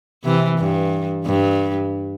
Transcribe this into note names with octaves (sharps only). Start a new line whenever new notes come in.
C3 E3
G2
G2